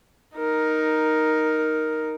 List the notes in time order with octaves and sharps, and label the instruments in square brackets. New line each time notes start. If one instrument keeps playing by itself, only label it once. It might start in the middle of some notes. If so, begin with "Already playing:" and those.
[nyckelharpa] D#4 A#4